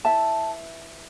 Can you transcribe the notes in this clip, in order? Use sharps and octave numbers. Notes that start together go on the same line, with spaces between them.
E4 B4 E5 A5